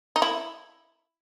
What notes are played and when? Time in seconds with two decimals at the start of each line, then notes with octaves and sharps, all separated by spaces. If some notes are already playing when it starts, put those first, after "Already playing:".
0.16 D#4
0.22 E4